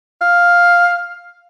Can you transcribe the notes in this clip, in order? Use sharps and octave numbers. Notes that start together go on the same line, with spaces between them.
F5